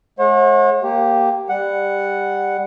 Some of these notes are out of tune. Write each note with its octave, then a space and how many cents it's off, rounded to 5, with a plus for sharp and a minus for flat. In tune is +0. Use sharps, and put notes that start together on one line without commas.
G#3 +40 C#5 -45 F#5 -35
A#3 +0 G4 +0
G3 +15 F#5 +0